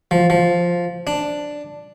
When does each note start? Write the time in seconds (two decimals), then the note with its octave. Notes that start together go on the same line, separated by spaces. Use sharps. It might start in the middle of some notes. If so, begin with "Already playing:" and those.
0.11 F3
0.30 F3
1.07 D4